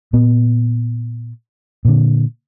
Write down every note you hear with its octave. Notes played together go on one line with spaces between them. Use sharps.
A#2 B3
A#2 D3